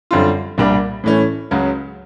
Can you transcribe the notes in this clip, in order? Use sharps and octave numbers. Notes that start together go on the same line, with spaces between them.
F#2 D3 G3 C4 F4
C2 A#2 G3 A#3 D4
A2 E3 A3 C#4
C#2 C#3 F#3